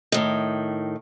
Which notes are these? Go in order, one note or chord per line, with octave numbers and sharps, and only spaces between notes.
A2 D#3